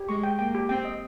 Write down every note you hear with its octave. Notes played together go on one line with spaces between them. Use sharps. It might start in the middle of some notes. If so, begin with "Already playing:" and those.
Already playing: G4
G#3 C#6
G5
A#3 G5
G4
C4 G5
D#5